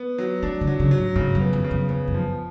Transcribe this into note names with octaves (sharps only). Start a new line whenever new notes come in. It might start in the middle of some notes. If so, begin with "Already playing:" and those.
Already playing: B3
F#3
A3 D4
D3
F#3
C#3
F#3
A2
G#2 C#3
F#2
B3
F2
C#3
F#2
F2 B3
F#2
F3